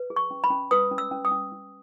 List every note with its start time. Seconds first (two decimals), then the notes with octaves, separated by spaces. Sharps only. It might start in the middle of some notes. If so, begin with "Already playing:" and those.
Already playing: B4
0.10 G#4
0.16 C#6
0.31 C#4
0.44 B5
0.50 C#4
0.71 B4 D#6
0.91 C#4
0.98 E6
1.11 C#4
1.25 D#6
1.31 C#4
1.52 C#4